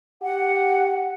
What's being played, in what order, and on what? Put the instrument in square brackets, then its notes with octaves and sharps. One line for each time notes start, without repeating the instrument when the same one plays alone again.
[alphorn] G4 [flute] F#5